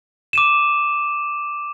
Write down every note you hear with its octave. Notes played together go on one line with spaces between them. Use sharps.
D6 D#7 E7